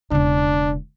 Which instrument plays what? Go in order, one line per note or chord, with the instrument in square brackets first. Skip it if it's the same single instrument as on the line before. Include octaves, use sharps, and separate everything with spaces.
[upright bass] E1 C#3 [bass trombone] D4